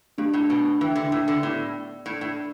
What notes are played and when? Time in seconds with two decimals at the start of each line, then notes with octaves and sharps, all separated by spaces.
0.18 G2 A3 D4 G4
0.33 A2
0.50 B2
0.80 E3 D4 B4 E5 G5
0.96 D3
1.12 A2
1.28 D3
1.43 A2 B3 G4 D5
2.06 A2 D4 A4 D5
2.21 A2